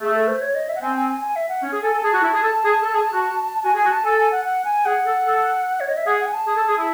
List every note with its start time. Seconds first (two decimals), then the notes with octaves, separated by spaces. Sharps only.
0.01 A3 G#4
0.15 A4
0.28 C5
0.41 C#5
0.55 D#5
0.69 E5
0.75 F#5
0.81 C4 G#5
0.96 G#5
1.09 G#5
1.22 G#5
1.36 E5
1.49 F#5
1.62 C#4
1.72 G#4
1.83 A4 G#5
1.93 A4
2.03 G#4 A5
2.13 F#4
2.23 E4
2.33 G#4
2.43 A4
2.64 G#4
2.83 A4
2.93 G#4
3.13 F#4
3.64 F#4 G#5
3.75 G#4
3.78 G#5
3.84 F#4
3.92 A5
4.05 A4 G#5
4.18 G#5
4.32 F#5
4.45 F#5
4.65 G#5
4.86 G#4 F#5
5.06 A4
5.25 A4
5.80 C#5
5.89 D#5
5.97 E5
6.06 G#4 F#5
6.20 F#5
6.26 G#5
6.34 A5
6.47 G#4
6.56 A4
6.67 G#4
6.77 E4